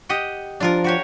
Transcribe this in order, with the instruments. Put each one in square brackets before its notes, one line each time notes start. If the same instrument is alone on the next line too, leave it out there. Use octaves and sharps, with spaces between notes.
[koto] G4 D#5 F#5
[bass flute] F3 [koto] D4 F4 A#4
[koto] F#4 G4 C#5